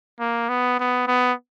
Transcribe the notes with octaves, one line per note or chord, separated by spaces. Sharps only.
A#3
B3
B3
B3